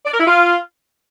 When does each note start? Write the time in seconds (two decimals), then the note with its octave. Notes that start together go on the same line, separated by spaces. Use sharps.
0.05 D5
0.13 A#4
0.20 E4
0.27 F4